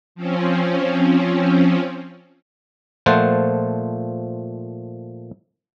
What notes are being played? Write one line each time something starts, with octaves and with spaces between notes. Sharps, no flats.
F3 C4 C#4
A#2 F3 A3 C5 F#5 A5